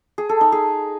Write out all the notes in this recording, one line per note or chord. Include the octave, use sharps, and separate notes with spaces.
G#4
A4
D#4
G#4